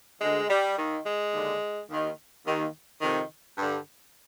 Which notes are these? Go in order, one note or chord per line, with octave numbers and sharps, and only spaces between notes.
D2 D3 G#3
G3
D#2 D#3
G#3
D#2 D3
D#2 D#3
D#2 D#3
F2 C3 D#3
G2 D3